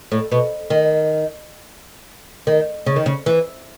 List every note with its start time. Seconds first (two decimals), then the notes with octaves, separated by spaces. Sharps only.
0.12 A2
0.32 B2
0.70 D#3
2.47 D#3
2.86 C#3
2.96 D#3
3.06 C#3
3.26 E3